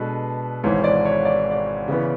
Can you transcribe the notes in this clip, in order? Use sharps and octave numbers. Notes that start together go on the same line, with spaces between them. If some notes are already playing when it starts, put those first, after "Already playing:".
Already playing: B2 G#3 D4 A4 B4
G#1 G#2 E3 C#5
D5
C#5
D5
D5
C#3 E3 B3